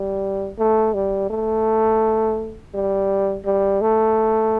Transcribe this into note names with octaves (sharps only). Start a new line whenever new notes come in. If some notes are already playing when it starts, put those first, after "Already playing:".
Already playing: G3
A3
G3
A3
G3
G3
A3